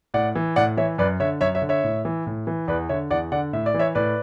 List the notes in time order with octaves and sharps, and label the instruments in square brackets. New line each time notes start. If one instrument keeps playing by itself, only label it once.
[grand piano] A2 D5 F#5
E3
A2 D5 F#5
E3 C#5 E5
F#2 B4 D5
D3 C#5 E5
F#2 C#5 E5
C#5 E5
D3
C#5 E5
A2
E3
A2
E3
E2 B4 D5
D3 C#5 E5
E2 D5 F#5
D3 D5 F#5
A2 E5
D5
E3
C#5 E5
A2 B4 D5